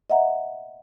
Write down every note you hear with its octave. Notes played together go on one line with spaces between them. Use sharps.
D#5 E5 F#5 A#5